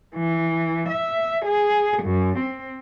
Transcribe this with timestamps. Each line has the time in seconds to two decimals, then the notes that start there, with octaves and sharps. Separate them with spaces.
0.16 E3
0.89 E5
1.46 G#4
2.03 F#2
2.38 C4